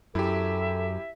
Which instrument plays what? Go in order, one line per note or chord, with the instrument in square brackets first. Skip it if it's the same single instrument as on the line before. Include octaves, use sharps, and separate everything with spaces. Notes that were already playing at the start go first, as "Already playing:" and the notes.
[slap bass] F#2 [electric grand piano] E4 G4 [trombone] A4 [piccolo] E5